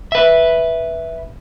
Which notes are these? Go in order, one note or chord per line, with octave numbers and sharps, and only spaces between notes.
B4 E5